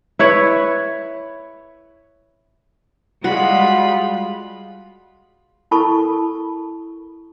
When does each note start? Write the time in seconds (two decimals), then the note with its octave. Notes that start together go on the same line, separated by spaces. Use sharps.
0.19 E4 B4 C#5
3.24 G3 G#3 F4 F#4 B5
5.71 E4 A4 A#4 A5 B5 C#6